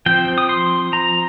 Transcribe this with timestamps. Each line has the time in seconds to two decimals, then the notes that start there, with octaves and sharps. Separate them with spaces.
0.06 F3 C4 G5
0.38 D#6
0.49 C6
0.93 A#5